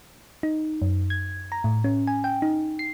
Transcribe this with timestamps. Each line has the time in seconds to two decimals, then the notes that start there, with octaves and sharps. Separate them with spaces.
0.43 D#4
0.82 F#2
1.10 G#6
1.52 A#5
1.64 A2
1.84 C#4
2.07 G#5
2.24 G5
2.42 D#4
2.79 C7